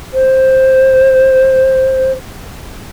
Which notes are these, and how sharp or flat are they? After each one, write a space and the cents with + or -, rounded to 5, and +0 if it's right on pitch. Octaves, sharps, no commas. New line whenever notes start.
C5 +10